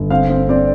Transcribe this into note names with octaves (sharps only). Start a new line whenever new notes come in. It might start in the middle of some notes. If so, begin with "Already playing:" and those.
Already playing: G1
C4 F5
C4
C4 D5